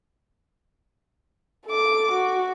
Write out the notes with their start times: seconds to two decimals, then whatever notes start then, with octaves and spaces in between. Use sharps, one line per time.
1.66 A4 D6
2.12 F#4